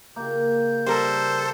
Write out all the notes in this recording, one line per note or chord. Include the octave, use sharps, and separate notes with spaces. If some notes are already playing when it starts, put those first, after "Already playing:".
C#3 A#3 G4 G6
G3 A4 A#4 C5 C6